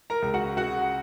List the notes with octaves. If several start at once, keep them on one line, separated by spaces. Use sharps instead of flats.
A#4 A#5
C#2
F#4 F#5
C#3 F#4 F#5